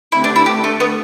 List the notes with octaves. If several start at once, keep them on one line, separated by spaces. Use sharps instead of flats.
D3 A3 C4 E4 G4 B4
D4
E4
A3 D4 G4 A4
A3
B3